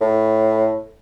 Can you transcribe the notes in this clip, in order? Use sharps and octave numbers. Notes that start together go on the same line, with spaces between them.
A2